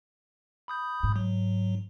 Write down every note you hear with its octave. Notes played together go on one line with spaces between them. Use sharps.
B5 D#6 G6
G#2
F#3